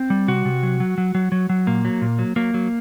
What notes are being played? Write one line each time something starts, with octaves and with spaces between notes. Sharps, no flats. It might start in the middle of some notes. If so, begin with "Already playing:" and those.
Already playing: C4
G3
C3 F#4
C3
F#3
F#3
F#3
F#3
F#3
F#3
A#2 A#3
F#3
A#2
F#3
F#3 A#3
F#3